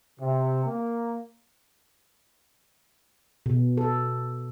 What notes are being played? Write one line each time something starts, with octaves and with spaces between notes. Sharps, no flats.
C3
A#3
B2
A4